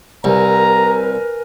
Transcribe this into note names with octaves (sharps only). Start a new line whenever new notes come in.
C2 A#4 B4 G#5 A#5